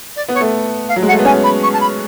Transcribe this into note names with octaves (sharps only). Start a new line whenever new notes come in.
D5
B3
C#5
A3
F5
F#3
G#3
A3 F#5
B3
C#4 G#5
B5
C#6
A5
B5